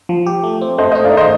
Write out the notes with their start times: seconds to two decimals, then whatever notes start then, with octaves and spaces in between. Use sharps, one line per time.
0.09 F3
0.26 G4
0.44 A3
0.61 C4
0.78 A3 C5 D#5
0.91 D#4 C5 D#5
1.05 D5 F5
1.13 D#3 C5 D#5